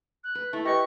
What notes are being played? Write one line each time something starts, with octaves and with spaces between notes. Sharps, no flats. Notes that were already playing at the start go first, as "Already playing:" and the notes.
F#6
B4
A3 E4
G4 B4 D#5 C#6 A#6